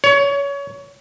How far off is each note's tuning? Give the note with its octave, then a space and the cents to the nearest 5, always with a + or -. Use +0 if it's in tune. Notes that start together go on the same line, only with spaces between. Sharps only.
C#5 +25